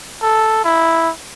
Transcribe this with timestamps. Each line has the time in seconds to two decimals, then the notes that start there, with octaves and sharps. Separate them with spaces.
0.22 A4
0.64 E4